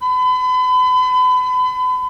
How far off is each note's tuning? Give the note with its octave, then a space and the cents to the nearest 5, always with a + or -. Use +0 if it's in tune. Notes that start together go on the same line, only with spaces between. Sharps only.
B5 +35